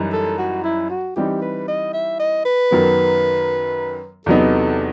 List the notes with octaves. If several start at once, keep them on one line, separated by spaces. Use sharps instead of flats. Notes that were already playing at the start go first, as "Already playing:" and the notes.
Already playing: F#2 E3 G3 D#4
A4
F#4
E4
F#4
E3 G3 C4 D#4 G4
B4
D#5
E5
D#5
B4
F#2 D#3 F#3 B3
E2 C3 F#3 B3 D#4 A4